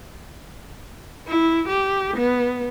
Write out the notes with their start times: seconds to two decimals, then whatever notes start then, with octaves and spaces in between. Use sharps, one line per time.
1.28 E4
1.68 G4
2.17 B3